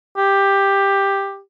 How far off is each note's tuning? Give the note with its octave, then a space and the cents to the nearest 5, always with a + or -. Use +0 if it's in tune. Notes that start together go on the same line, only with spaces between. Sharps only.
G4 +10